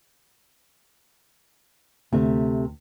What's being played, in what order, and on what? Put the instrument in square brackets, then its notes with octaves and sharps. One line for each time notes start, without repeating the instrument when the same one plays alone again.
[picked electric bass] D2 [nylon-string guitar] C3 A3